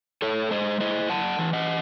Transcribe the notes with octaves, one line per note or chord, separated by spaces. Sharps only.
A2 A4 C#5
G#3 C5 D#5
E4 C5 D#5
F#2 F#5 A5
E3
D#5 F#5